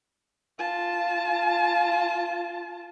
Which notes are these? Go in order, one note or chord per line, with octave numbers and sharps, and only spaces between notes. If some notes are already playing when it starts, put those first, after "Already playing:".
F4 A5